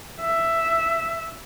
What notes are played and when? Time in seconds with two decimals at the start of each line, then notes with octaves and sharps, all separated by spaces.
0.20 E5